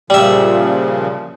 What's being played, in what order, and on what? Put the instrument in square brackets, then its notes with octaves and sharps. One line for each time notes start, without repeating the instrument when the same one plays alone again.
[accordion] A#2 C#3 F3 [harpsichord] G3 E5